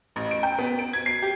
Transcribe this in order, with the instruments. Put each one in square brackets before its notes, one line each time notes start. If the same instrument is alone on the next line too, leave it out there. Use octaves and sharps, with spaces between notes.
[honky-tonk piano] A1
D7
G5
B3
D7
G#6
C7
G4